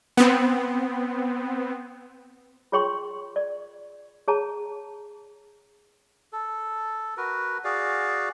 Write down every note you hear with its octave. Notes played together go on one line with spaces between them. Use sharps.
B3 C4
F4 G#4 C#5 G5 C6 C#6
D5
G#4 C#5 A5 A#5
A4
F#4 A#4 B4
F#4 G#4 D5 F5